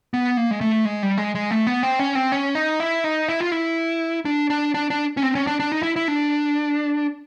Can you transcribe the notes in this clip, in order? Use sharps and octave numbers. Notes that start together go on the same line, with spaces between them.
B3
A#3
G#3
A3
G#3
G3
G#3
G#3
A3
B3
C4
C#4
C4
C#4
D#4
E4
D#4
E4
F4
E4
D4
D4
D4
D4
C#4
C4
C#4
D4
D4
D#4
E4
E4
D4